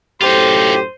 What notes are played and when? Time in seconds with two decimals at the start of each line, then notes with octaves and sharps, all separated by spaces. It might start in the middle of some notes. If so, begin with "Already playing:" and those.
0.21 F#2 A2 D#4 F4 G4 A4 C5